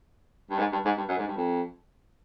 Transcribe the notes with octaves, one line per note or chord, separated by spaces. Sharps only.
G2
G#2
G2
G#2
G2
F#2
G#2
G2
F2